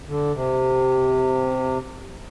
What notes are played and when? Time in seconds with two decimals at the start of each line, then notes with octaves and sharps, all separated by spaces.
0.09 D3
0.34 C3